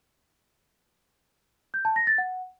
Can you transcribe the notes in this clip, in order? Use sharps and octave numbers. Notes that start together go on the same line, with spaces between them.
G6
A5
A#6
A6
F#5